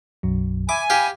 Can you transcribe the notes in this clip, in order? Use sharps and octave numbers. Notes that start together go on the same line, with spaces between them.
B1 F#2 F#3
E5 G#5 B5 D6
G4 F5